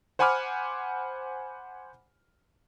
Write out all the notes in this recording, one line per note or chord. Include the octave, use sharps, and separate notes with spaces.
C5 F#5 G#5 B5 D6 F6